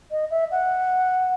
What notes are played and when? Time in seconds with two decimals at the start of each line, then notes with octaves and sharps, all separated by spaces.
0.11 D#5
0.31 E5
0.51 F#5